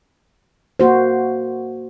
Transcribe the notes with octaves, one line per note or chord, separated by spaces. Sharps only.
A#3 F#4 C5